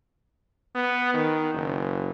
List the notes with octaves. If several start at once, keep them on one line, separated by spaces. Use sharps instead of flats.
B3
D#3
F#1